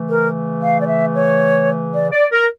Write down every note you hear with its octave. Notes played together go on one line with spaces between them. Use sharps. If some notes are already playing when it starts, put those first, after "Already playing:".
Already playing: C#3 E3 A3
A#4
F5
D5
E5
C#5
D5
D5
A#4